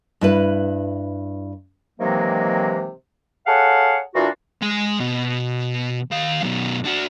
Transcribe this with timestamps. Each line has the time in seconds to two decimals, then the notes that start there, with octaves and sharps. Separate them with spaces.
0.21 G2 E4 B4
1.99 C3 D#3 E3 F#3 G#3 A#3
3.47 G#4 A4 C#5 F5 F#5
4.15 A#2 E3 D4 F4 F#4
4.61 G#3 G#5
5.00 B2
6.11 D#3 F5
6.42 F#2 B2
6.85 D4 F#4